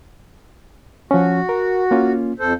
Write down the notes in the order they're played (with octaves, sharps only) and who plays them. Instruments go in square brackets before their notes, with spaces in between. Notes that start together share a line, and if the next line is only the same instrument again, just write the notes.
[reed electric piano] F3 C#4 [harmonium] F#4
[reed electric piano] A#4
A#3 C#4 F4
[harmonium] F2 A4 C5